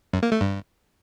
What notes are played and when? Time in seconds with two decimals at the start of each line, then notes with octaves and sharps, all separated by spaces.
0.13 F#2
0.23 A#3
0.32 A3
0.41 G2